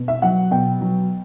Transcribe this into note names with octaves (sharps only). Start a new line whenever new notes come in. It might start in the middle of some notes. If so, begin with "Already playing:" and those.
Already playing: B2
E5
F#3 F#5
B2 G5
F#3